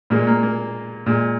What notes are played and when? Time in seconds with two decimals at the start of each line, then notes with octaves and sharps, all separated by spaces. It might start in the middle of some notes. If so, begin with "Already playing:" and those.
0.10 A#2 G#3 A#3
0.27 A#3
0.43 A#3
1.06 A#2 G#3